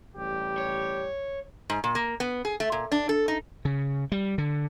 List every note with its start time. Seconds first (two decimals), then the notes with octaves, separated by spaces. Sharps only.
0.16 A1 G3 G4
0.58 C#5
1.70 G#2
1.84 A#2
1.95 A#3
2.20 B3
2.45 G#4
2.60 A3
2.72 A#2
2.92 D4
3.09 A4
3.28 D#4
3.65 C#3
4.12 G3
4.38 D3